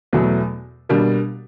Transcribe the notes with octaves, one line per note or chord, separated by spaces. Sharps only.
E2 B2 F#3 A3
B2 G3 A#3 D4